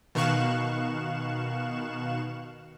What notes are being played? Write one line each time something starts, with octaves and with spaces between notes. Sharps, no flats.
B2 D#3 F5 C#6 F#6 E7